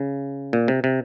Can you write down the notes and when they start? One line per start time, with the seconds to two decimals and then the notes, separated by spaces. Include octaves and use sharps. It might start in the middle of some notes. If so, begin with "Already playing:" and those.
Already playing: C#3
0.53 A#2
0.68 C3
0.84 C3